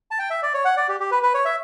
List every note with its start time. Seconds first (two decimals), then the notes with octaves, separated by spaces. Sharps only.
0.11 A5
0.19 G5
0.30 E5
0.43 D5
0.54 C#5
0.65 F#5
0.77 D5
0.89 G4
1.00 G4
1.11 B4
1.23 B4
1.34 C#5
1.45 E5